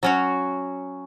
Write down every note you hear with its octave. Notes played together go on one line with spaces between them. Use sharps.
F#3 C#4 F#4